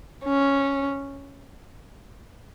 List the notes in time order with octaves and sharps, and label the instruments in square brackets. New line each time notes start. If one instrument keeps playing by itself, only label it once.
[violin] C#4